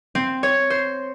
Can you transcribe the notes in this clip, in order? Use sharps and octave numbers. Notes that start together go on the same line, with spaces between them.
C4
C#5
C5